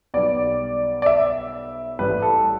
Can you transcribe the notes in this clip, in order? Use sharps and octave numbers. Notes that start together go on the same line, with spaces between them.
B1 B2 G3 D5
D5
E5
A1 A2 G3 B4
A4